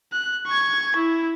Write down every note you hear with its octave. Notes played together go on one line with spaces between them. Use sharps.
F#6
C#6 G#6
E4